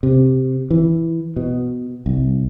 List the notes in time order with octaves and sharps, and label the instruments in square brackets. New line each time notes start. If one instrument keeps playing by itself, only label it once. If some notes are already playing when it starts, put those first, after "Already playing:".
[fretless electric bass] C3
E3
B2
C2